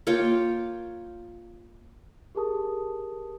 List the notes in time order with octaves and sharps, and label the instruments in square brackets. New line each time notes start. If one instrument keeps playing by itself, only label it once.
[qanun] A#3 F4 C#5 G5
[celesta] G4 G#4 A#4 A5 D#6